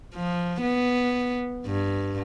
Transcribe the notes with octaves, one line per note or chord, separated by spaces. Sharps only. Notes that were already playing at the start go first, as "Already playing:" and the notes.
F3
B3
G2